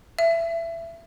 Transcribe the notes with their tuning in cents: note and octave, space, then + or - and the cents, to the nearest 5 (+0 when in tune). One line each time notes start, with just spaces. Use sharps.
E5 +20